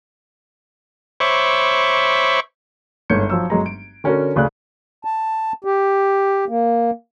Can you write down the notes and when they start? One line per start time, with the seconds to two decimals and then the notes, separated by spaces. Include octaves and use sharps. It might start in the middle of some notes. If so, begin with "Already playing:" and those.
1.20 C5 C#5 E5 B5 C#6 D6
3.10 G1 G#2 C#5 G6 G#6 C#7
3.30 F3 F#3 E6
3.50 G1 F#3 G#3 A#5
3.66 D7
4.04 D3 C#4 D4 F#4 A#4
4.36 D2 C#3 D5 F#6
5.05 A5
5.65 G4
6.49 A#3